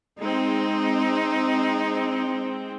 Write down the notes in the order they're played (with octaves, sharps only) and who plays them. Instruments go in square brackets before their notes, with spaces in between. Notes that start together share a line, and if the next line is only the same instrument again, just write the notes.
[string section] G#3 C4 [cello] D#4